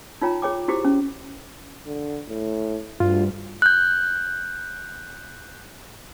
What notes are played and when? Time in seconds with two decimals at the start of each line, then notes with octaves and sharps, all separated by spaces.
0.22 D#4 F4 C#5 G5 A#5
0.42 G#4 C#5 G5 D6
0.68 E4 F#4 G4 C5 D6
0.85 C#4
1.87 D3
2.28 A2
3.00 D2 G2 F4
3.62 F#6 G6